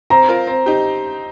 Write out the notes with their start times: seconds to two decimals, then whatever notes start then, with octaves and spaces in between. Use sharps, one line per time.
0.10 C4 A#5
0.29 F4 A#4
0.47 C4
0.66 D#4 G4